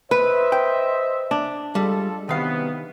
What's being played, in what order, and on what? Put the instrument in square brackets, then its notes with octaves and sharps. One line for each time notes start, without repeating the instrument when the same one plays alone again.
[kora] B4 [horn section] C5 D#5 E5
[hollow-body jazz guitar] G5
[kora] D4
[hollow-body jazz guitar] G3 [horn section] G#3 F4 A4
[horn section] C3 F#3 B3 [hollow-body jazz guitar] D#3 F5